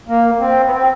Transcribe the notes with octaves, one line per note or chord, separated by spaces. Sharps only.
A#3
C4
B3
C4